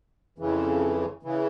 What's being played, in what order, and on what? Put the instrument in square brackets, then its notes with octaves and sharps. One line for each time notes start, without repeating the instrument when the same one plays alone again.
[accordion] F2 C#3 E3
C#3 E3